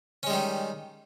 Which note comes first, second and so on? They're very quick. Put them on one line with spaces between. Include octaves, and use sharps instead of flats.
C#4 G#3 G3 D#3